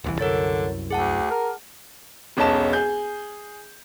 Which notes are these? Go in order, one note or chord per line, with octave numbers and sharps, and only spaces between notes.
D#1 C2 E3
C2 F#2 D3 A#4 C#5 A6
D2 G#4 F#5 A5
A#4
E1 B1 C#4 D#5 A5 E7
G#4 G6